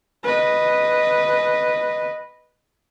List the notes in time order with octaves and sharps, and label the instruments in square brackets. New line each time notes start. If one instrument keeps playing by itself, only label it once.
[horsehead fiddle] B4 D#5